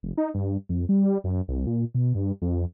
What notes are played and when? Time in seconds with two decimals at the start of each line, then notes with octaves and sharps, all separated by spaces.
0.03 F1
0.17 D#4
0.34 G2
0.69 F2
0.89 G3
1.24 F#2
1.48 C2
1.67 A#2
1.95 B2
2.15 G2
2.42 F2